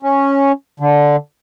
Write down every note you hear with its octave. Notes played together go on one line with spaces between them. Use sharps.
C#4
D3